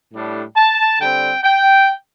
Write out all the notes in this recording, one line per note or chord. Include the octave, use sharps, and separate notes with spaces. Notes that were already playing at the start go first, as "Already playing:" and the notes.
A2 G3 D4
A5
D3 G3 C4 G5
G5